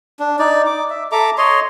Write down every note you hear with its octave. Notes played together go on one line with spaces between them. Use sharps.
D4
D#4 D5
D6
E5
A4 E5 A#5 D6
C#5 D#5 C6